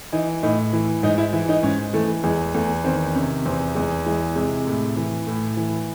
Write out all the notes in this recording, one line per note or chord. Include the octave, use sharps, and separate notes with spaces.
E3 D#4
A2 D#4
E3
G#2 D#4
E4
E3 E4
D#4
G#2 C#4
E3 A3
E2 G#3
E2 A3
D#3 C4
C3 C#4
E2 C4
E2 G#3
E3 G#3
C3 G#3
A2
E3
A2
E3